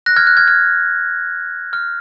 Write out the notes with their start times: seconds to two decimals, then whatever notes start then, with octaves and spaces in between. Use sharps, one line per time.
0.06 F#6 A#6
0.16 F6 G#6
0.27 F#6
0.37 F6 G#6
0.47 F6 G#6
1.73 F6